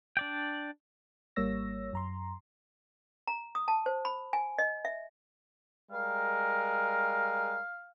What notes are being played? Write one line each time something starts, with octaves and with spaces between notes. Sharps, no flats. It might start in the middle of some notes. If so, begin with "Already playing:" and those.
D4 D5 G5
G#1 G3 A#3 C#5 E6 A#6
F#2 A#5 C6
A#5
D#6
A5
C5
B5
G#5
D#5
E5
G3 G#3 A#4 F5